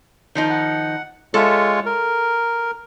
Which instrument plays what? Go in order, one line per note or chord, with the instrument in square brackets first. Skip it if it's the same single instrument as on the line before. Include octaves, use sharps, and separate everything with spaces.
[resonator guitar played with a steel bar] D#3 F3 D#4
[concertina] F#5
[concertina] G#3 F4 C#5 [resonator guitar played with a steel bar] A4 E5
[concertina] A#4